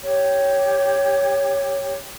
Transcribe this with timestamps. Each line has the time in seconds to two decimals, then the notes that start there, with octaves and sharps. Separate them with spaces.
0.03 G4 C#5